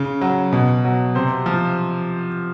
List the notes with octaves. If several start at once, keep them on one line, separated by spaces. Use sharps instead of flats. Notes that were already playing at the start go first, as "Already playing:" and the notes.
Already playing: C#3
F#3
B2
F#3
C3 C5
F3